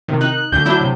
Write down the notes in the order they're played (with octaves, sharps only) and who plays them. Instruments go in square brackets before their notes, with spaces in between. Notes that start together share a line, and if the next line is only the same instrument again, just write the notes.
[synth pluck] C3 D#3
[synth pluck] D#4 [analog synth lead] F#6
[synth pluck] D2 D3 [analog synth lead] G6
[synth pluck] F#3 D4 E4
C3